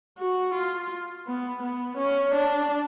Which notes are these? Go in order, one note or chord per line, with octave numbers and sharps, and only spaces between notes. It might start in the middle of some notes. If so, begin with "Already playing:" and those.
F#4
F4
B3
B3
C#4
D4